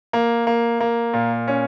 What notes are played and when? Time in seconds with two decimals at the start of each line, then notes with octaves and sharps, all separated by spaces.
0.13 A#3
0.47 A#3
0.80 A#3
1.14 A#2
1.48 C#4